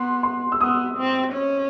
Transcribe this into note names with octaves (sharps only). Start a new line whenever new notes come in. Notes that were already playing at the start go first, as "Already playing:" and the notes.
Already playing: B3 C6
C6
E6
B3 D#6
C4
C#4